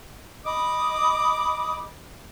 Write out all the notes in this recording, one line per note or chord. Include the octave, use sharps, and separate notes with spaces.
D#5 B5 D6 D#6